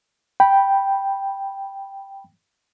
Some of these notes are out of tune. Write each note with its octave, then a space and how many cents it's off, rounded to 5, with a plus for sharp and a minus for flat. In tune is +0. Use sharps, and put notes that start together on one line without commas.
G5 +0 B5 -10